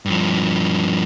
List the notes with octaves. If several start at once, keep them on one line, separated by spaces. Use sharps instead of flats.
G2 F3